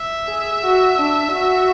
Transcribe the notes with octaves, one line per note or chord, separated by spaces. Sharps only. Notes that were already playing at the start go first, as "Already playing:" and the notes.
Already playing: E5
G#4
F#4
D4
F#4